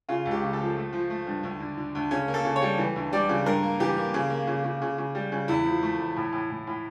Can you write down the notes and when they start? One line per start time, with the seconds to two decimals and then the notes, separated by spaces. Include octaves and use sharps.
0.09 C#3 F4
0.25 C#2
0.31 G4
0.43 C#3
0.53 A4
0.59 F3
0.76 A3
0.93 F3
1.10 A3
1.26 G2
1.43 D2
1.60 D3
1.78 D3
1.95 D2
2.11 C#3 C#4
2.28 A#3
2.34 A4
2.45 C#3
2.56 C#5
2.62 G3
2.78 E3
2.96 D2
3.12 G3 D5
3.29 C#3
3.46 G2 A#4
3.63 A#3
3.80 E3 G4
3.97 A#3
4.14 C#3
4.30 A#3
4.47 C#3
4.64 C#3
4.82 C#3
4.98 C#3
5.15 G3
5.32 C#3
5.48 E2 E4
5.65 F3
5.83 A3
5.99 E2
6.16 A2
6.33 A2
6.50 A2
6.67 A2